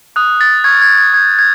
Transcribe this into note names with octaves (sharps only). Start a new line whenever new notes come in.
D#6 F#6
A6
C#6 F6 G#6
G#6
G#6
D#6 G6 G#6
G#6